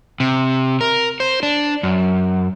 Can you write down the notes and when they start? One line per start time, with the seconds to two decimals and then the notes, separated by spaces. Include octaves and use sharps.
0.20 C3
0.81 A#4
1.20 C5
1.43 D4
1.83 F#2